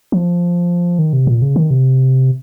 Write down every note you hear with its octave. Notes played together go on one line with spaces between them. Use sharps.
F3
D#3
C3
A#2
C#3
D#3
C3